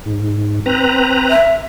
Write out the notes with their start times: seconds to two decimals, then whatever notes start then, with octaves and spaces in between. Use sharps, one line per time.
0.06 G#2
0.66 C4 B4 A#5
1.30 E5